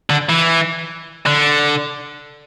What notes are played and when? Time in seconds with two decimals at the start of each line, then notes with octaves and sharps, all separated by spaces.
0.10 D3
0.29 E3
1.26 D3